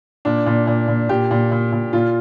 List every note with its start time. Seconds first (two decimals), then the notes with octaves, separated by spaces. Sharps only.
0.25 A#2 D4
0.46 A#2
0.67 A#2
0.88 A#2
1.09 A#2 G4
1.31 A#2
1.52 A#2
1.72 A#2
1.93 A#2 F4